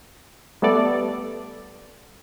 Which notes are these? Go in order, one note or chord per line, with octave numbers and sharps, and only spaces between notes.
G3 A3 B3 A4 D5